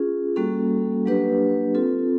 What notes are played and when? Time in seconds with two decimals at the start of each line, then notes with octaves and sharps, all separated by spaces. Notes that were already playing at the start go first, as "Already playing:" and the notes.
Already playing: C#4 F4 G#4
0.36 G3 A#3 C#4 F#4 A4
1.06 F#3 A#3 D4 G4 B4
1.75 C4 F4 A4